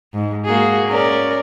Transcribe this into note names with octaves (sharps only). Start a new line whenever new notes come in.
G#2
A#3 F#4 G#4
C#4 A#4 D5